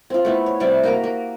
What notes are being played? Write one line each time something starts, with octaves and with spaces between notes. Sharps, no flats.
C4 F4
A3 B3 E4
C#5
C3 G3 D5 E5
A#3 F#4 G4 A#4
A#3